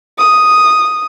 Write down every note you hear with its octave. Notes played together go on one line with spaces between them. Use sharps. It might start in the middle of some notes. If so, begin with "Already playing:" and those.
D#6